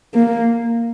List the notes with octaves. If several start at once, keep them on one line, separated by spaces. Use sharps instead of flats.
A#3